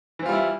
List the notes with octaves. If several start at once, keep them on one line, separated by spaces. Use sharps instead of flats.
E3 G3 C4 E4 F4